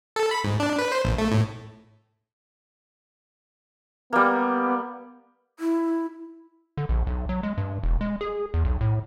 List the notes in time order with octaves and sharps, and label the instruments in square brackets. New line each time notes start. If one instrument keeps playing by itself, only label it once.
[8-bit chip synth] A4
B5
G#2
D4
B4
C5
A#1
A3
A2
[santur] G3 A#3 [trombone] B3
[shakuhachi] E4
[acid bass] D3
A#1
B1
F#3
G#3
G2
E1
G#3
G#4
E2
B1
A2